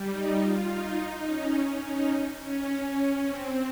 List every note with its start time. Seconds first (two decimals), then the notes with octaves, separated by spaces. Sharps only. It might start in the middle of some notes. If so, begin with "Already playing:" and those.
Already playing: G3
0.09 D#4
0.39 F4
0.67 D#4
1.25 C#4
1.83 D#4
2.40 C#4
3.27 C4